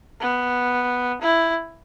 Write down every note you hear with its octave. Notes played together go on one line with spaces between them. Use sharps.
B3
E4